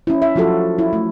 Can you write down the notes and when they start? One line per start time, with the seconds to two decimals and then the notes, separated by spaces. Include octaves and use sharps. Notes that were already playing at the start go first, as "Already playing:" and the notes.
0.07 C#4 E4
0.22 E5
0.36 F3 F#3 F4 F#4 A4
0.78 E4
0.93 A3